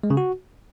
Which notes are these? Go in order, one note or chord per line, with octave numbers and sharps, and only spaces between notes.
G#3
C#3
F#4